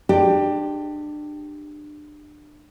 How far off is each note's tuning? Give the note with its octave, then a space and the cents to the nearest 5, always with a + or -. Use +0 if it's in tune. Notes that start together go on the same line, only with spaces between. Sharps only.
G#3 +30 D4 +30 G4 +0